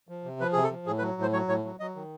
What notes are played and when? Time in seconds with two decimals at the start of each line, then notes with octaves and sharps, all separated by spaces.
0.09 F3
0.24 C3
0.40 F3 B4
0.53 C3 G#4
0.63 A4
0.71 F3
0.86 A2 G#4
0.98 B4
1.02 F#3
1.17 A2 C5
1.33 F#3 C#5
1.48 A2 C#5
1.64 F#3
1.80 F#3 D#5
1.95 D#3